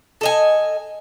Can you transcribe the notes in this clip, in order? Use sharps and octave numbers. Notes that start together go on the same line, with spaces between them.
A4 D#5 G#5